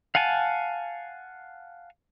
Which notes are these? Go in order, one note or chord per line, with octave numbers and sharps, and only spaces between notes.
F5 F#5 G#5 A5